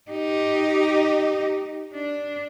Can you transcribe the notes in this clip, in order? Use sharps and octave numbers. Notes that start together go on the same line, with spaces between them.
D#4 G4
D4